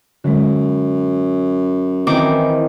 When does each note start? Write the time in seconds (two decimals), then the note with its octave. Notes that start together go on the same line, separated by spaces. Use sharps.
0.24 F#2 D3 G#3
2.07 D#3 E3 C4 D6